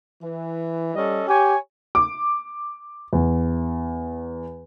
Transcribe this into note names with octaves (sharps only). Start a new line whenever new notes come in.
E3
G3 C#4 A4 D#5
G4 C#5 G#5
D6
E2